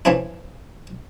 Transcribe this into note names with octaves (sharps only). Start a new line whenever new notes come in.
E3 F3 C#4 D4 E4